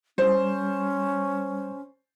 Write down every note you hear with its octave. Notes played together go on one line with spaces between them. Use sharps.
G3 C#4 C5